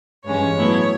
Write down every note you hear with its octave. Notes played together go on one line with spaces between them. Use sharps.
G2 E3 G#3 C#4 C#5
A2 F#3 B3 E4